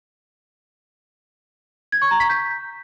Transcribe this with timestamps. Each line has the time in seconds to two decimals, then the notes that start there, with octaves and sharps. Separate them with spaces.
1.92 G#6
2.02 C#6
2.11 A#5
2.20 B6
2.29 G6